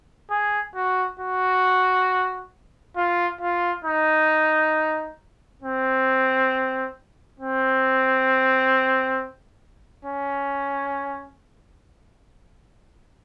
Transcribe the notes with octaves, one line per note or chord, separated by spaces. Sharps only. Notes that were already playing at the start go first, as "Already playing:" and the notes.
G#4
F#4
F#4
F4
F4
D#4
C4
C4
C#4